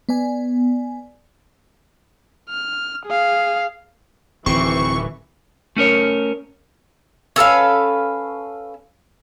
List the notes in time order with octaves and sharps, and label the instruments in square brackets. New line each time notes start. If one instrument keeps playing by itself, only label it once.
[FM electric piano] B3 D5 G#5
[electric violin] F6
G#4 F5
[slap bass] D1 D#3 [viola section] E3 [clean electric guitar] C4 [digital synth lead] C#6
[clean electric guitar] A3 C#4 A#4 C#5
[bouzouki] C#4 A4 B4 F5